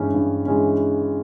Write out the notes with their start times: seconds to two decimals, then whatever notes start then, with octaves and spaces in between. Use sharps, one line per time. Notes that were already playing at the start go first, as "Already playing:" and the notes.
Already playing: G2 E3 G#3 C#4
0.14 G2
0.45 E3 G#3 C#4